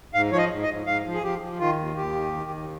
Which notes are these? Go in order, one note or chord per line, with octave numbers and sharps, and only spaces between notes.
G#2 F5
F3 C#5
D#5
G#2
D#5
G#2
G#2 F5
F3
G#4
F3 G4
F3
D#3 F4
D#2
D#2 G4
D#3
D#3
D#2